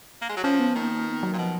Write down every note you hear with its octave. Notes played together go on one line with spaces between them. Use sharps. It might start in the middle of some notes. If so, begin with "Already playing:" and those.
A#3
G#3
F#3
F3 C#4
B3
D#3 A#3
B3
F#3
A#2
B2 F3